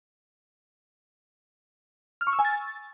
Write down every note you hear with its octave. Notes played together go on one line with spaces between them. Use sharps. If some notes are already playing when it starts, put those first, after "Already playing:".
F6
C#6
E6
G#5
A6